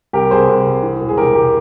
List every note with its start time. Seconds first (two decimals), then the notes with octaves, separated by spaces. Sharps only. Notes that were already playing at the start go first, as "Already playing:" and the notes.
0.13 C2 G4 A#4
0.31 C2 G#4 C5
0.48 C2
0.66 C2
0.83 E3
1.01 E1
1.09 G#4
1.18 E1 G4 A#4
1.35 E1 G4